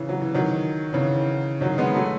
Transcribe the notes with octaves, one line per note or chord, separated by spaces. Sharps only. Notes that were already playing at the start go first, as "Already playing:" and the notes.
Already playing: C#3 E3
F#3
E3
D#3 F#3
C#3 E3
D#3 F#3
G#3 B3
F#3 A3